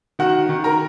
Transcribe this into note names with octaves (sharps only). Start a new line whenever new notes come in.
D#3 F#4 F#5
D#3
A#4 A#5